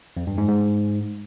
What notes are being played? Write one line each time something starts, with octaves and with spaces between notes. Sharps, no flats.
F2
G2
G#2
G#2